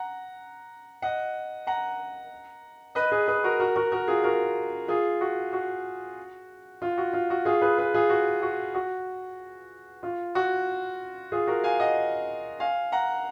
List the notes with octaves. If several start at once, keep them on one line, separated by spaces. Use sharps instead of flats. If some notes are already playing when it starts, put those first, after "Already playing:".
Already playing: F#5 A#5
D#5 F#5
F#5 A#5
B4 D#5
G#4 B4
G#4 B4
F#4 A#4
F#4 A#4
F#4 A#4
F#4 A#4
F4 G#4
F#4 A#4
F4 G#4
F#4
F#4
F4
F#4
F4
F#4
F4 G#4
G#4 B4
G#4 B4
F4 G#4
F#4
F#4
F#4
F4
F#4
F4 G#4
F#4 A#4
F5 G#5
D#5 F#5
F5 G#5
F#5 A#5